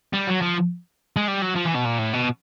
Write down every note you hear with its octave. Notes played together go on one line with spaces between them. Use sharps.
G3
F#3
F3
G#3
G3
F#3
F3
E3
B2
A#2
A2
B2